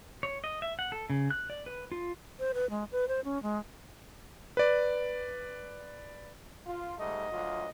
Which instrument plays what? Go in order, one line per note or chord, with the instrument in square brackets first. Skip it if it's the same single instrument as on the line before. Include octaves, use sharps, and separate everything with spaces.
[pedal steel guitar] C#5
D#5
E5
F#5
A4
C#3
F#6
D5
B4
F4
[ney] C5
B4
G#3
B4
C5
C#4
G#3
[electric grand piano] B4 D5
[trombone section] F4
[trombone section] G#2 G3 A3 [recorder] D#5
[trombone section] D2 F#3 F4